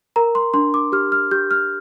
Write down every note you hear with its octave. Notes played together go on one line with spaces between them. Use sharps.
A#4 A#5
C6
D4 C6
D6
G4 F6
F6
G4 G6
F6